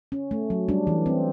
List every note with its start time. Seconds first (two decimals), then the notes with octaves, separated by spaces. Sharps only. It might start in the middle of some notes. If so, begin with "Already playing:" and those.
0.12 C#4
0.31 A3
0.50 F#3
0.68 G3 D4
0.87 E3
1.06 C4